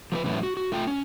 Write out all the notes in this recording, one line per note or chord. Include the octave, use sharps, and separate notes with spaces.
F3 A#4 B4
E2 A2 F#3 C#4 E4 B4
F#4
F#4
A3 F4 G5
C#4